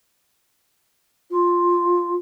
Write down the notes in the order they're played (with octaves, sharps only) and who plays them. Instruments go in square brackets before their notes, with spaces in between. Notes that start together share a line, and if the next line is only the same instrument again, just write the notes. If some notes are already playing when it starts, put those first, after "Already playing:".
[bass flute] F4